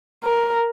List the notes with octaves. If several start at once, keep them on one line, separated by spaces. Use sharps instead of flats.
A#4